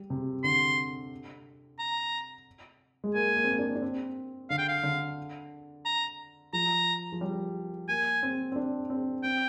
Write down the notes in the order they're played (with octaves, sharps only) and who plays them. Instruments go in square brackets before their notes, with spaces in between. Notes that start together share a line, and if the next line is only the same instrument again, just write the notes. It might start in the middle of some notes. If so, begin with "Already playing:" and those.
Already playing: [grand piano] G3
C3
[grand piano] D3 [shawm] C6
[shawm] A#5
[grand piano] G#3
[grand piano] A#3 [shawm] G#5
[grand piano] A#3
C4
A#3
D4
D4
C4
[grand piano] D3 [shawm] F5
[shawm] G5
F5
[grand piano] D3
[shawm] A#5
[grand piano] F3 [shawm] A#5
[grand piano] F3
G3
[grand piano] A#3 [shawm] G#5
[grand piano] C4
C4
D4
C4
[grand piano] C4 [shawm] G5